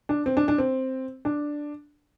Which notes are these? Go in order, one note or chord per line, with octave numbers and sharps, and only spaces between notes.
D4
C4
D4
D4
C4
D4